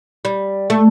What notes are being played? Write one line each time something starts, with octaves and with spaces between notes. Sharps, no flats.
G3
A3